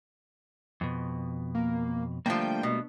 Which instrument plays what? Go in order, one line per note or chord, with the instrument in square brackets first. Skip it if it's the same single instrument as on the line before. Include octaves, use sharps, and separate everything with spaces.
[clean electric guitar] F2 B2
[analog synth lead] A#3
[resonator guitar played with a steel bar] D3 F3 [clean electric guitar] G3 A3 A#3 [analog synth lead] G5
[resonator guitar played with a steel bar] B2